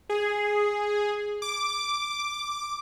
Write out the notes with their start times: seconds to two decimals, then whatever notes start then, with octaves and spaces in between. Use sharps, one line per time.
0.09 G#4
1.42 D6